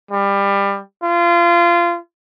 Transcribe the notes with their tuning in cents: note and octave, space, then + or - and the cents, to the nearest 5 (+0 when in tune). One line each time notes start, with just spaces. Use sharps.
G3 +25
F4 -25